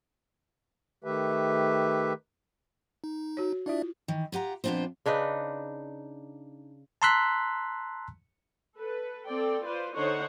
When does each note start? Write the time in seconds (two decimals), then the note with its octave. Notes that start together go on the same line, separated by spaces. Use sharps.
1.04 D#3 A3 G4 B4 E5
3.04 D#4
3.37 F#4 C#5
3.66 D4 E4 F4 D5 E5
4.08 D#3 E3
4.32 F4 G4 F#5 A#5
4.64 F2 A#2 B3 D4 F4 C5
5.06 C#3 D4 D#4 B4
7.02 A5 A#5 C6 E6 F#6 B6
8.76 A4 B4
9.27 C4 A4 D5 G5
9.63 F4 B4 C5 D5
9.94 D3 D#4 C5 C#5 F#5